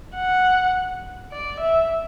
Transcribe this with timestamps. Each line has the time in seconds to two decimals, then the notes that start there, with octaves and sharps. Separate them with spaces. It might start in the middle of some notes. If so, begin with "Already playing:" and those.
0.16 F#5
1.32 D5
1.61 E5